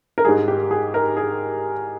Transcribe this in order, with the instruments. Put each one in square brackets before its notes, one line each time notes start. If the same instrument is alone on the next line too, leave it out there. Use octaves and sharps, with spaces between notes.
[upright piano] A#4
G#2 G3 G#4
G4
G#4
A#4
G#4